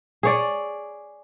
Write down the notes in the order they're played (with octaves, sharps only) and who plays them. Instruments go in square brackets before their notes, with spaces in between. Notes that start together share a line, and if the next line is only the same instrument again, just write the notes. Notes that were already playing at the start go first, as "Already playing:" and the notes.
[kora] G#4 C#5 D5